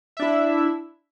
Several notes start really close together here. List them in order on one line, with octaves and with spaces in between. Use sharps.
E5 D4 E4